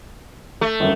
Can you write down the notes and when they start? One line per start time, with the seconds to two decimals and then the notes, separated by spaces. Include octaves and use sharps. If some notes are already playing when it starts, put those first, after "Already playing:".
0.61 A3
0.80 G1 F#2